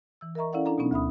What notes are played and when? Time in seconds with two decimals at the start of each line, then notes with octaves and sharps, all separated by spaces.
0.21 E3 E6
0.35 A#4 D#5 E5 A#5 C#6
0.53 C#4 E4 A4 D5 F5 F#5
0.65 D4 E4 A4 A#5
0.78 B2 F#3 B3 C#4 D#4
0.91 D2 E5 B5 D#6